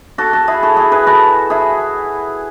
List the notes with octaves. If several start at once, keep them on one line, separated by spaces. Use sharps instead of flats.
F#4 A4
F#4 A4
E4 G#4
F#4 A4
E4 G#4
G#4 B4
F#4 A4
E4 G#4